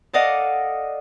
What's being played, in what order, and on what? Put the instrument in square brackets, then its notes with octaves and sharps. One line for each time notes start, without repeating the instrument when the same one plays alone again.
[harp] A4 D5 D#5 F5 F#5